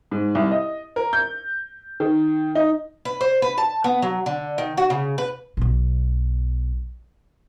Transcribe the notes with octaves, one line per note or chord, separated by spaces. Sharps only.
G#2
C2
D#5
A#4
G6
D#3
D#4
B4
C5
B4
A5
B3
F#3
D3
D#3
F#4
C#3
B4
B1 B2